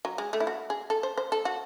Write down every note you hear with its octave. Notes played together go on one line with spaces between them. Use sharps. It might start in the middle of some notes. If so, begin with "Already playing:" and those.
F#3
G#3
A3
E4
F#4
G#4
A4
C5
C5
A4
F#4